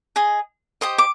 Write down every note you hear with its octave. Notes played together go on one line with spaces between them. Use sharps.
G#4 D#5
G4 C5 D#5 D#6
D6